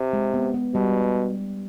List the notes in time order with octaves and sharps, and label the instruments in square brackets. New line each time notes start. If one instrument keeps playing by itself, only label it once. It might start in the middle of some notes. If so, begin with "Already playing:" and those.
Already playing: [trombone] C3
[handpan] G#3
B3
B3
[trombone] B2 [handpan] G3